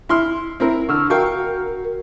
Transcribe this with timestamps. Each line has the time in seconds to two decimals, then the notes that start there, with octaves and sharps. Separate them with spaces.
0.09 E4 C6 F6
0.60 C4 E4 A#4
0.89 D3 C#6 E6 F6
1.10 F#4 A#4 F5 G5 C#6